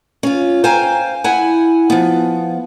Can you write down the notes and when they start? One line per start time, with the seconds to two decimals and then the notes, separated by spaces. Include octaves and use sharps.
0.23 C#4 F4
0.64 C5 F5 G5 G#5 A#5
1.24 E4 F#5 G#5
1.90 F3 B3